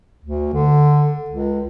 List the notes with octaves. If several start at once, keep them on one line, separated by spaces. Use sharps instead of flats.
D2
D3
C#2